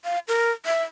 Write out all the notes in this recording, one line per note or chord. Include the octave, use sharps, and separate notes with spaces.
F5
A#4
E5